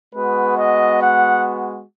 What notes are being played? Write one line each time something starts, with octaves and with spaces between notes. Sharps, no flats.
G#3 B3 F#4 B4
D#5
F#5